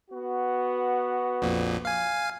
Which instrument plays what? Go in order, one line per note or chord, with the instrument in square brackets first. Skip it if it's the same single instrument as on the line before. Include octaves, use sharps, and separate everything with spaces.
[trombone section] B3 F#4
[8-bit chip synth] A#1 F2 A#2
F5 G#5